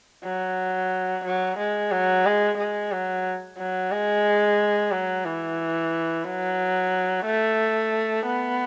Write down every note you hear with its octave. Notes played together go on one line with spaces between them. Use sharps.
F#3
F#3
G#3
F#3
G#3
G#3
F#3
F#3
G#3
F#3
E3
F#3
A3
B3